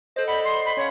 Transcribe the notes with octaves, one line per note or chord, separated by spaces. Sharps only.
A4 C5 D#5
D5 D#5 F#5 B5
C6
B5
C#4 C#5 F5